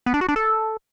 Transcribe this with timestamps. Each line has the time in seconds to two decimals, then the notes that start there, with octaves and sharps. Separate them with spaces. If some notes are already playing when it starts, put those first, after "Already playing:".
0.06 B3
0.14 D4
0.21 F#4
0.29 D4
0.36 A4